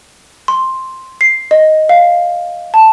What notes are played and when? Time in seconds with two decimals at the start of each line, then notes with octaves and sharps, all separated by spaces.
0.48 C6
1.21 C7
1.51 D#5
1.89 F5
2.74 A5